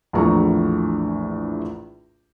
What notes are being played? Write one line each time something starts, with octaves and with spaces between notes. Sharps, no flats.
A#1 E2 A2 D3 A#5 C#6